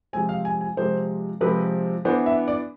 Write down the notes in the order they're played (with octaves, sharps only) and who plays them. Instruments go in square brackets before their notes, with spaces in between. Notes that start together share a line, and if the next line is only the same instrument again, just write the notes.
[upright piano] C3 F3 G#3 C4 G#5
F5
G#5
G#5
C3 F3 G#3 C4 C5
C3 F3 G#3 C4 B4
E3 B3 D4 C5
E5
D5